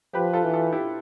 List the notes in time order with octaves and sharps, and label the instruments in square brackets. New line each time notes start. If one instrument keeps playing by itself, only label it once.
[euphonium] F3 [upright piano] G4 B4
[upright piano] F4 A4
[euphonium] E3
[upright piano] F4 A4
E4 G4